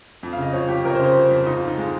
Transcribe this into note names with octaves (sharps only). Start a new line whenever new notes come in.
F2
F5
C#3
D#5
F3 C#5
F2 G4
F2 A#4
C#5
C5
C#3
C5
F3
F2
G#2 D#4
F4
F3
D#4
G#3